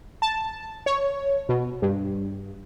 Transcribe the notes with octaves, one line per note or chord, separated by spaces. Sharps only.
A5
C#5
B2
G2